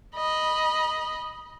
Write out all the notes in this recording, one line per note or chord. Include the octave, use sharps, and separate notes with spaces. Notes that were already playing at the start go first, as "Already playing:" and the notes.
D#5 B5